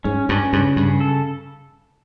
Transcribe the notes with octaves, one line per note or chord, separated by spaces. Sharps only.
G#2 C#4
G2 C#4
G2 C#3
G2 C#3
A4